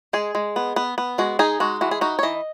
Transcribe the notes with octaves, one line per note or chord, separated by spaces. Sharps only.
G#3 G#4
G#3
B3
B3
B3
G#3 F#4
D#4 G#4
G#3 F#4
E3 F#4
G#4
D#4 F#4
C#5
E3 D#5